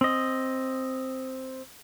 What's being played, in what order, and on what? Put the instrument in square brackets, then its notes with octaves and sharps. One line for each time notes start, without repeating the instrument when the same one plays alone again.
[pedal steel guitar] C4 D#5